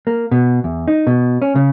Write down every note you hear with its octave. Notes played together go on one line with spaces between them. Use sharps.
A#3
B2
E2
D#4
B2
C#4
C#3